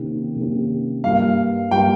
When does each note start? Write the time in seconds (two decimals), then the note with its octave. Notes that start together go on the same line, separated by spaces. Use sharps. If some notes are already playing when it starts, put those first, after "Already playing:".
Already playing: C3 D#3 A#3 C#4 G4
0.36 C3 D#3 A#3 C#4 G4
1.03 G2 G3 A#3 F5
1.71 G2 G3 A#3 G5